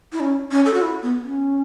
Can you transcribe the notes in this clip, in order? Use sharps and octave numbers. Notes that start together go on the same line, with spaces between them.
E4
C#4
C#4
A4
F#4
E4
B3
C#4